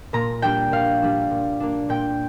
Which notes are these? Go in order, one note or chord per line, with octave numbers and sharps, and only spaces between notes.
A#2 A#5
G3 D4 G5
A#2 F5
G3 D4
A#2
A#3 D4
A#2 G5